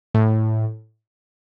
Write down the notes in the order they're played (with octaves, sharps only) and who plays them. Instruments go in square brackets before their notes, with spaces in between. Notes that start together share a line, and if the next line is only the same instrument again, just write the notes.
[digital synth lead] A2